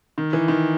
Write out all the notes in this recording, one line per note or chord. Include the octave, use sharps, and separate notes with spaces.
D#3
E3
D#3